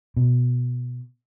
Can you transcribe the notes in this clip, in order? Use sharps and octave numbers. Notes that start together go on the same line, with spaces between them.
B2